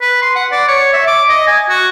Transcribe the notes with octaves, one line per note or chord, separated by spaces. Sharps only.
B4
C6
F#5
D5
C#5
E5
D6
D#5
G#5
F#4